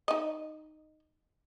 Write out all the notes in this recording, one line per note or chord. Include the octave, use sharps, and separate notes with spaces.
D#4 D#5